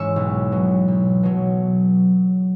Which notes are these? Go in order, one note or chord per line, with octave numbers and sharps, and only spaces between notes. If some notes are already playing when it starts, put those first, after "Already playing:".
Already playing: G#2 E3 G#3 C#4 C#6 E6
B1
B2 F#3
B1
B2 F#3